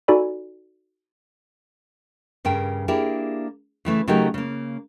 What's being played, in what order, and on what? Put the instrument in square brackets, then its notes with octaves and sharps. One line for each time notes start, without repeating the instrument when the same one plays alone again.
[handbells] D#4 F#4 A4 D5 G#5 B5
[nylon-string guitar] G2 C#3 A#4 G5
A#3 D4 E4 G4 G#4 A#4
C#3 E3 A3
C#3 F#3 A3 D#4 G4 A#4
C#3 A#3